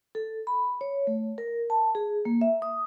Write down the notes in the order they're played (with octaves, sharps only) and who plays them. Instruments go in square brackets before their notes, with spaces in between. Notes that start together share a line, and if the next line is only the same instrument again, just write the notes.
[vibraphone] A4
B5
C#5
A3
A#4
A5
G#4
A#3
E5
D#6